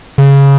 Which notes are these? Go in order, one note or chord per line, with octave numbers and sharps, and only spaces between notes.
C#3